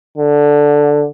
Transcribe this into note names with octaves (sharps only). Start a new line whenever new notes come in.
D3